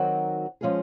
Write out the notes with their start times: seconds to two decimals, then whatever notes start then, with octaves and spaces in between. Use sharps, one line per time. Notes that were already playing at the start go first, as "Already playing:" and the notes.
Already playing: D#3 F#3 C4 F#4 A#4
0.61 F3 G#3 C#4 F4 G#4